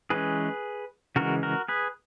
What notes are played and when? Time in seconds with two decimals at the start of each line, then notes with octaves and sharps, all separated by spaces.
0.10 E3 G#3 C#4 G#4 B4
1.16 C#3 E3 G#3 F#4 A#4
1.43 F#4 A#4
1.68 G#4 B4